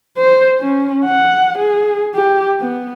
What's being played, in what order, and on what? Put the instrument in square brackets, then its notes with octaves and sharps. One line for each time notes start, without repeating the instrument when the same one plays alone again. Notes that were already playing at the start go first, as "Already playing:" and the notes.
[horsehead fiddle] C5
C#4
F#5
G#4
G4
B3